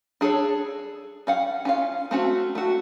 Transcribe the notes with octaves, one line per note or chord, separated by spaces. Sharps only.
D4 G#4 A4 C#5
C#4 F5 F#5
C#4 F4 F5
A3 C4 C#4 F#4
A3 F#4